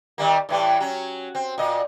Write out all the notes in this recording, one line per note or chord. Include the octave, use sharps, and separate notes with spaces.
D#3 G3 A#3
A2 E3 G3
F#3 C#4
C4
A#2 D#5